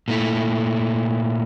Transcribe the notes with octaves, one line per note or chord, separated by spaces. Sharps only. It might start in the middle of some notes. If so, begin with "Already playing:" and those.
A#2 A3 E4